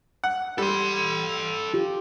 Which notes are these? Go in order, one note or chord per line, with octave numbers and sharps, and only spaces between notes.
F#5
G3 A4 C6
F4 G4